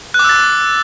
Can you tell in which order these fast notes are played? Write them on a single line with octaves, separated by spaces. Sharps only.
F#6 D6 E6 A6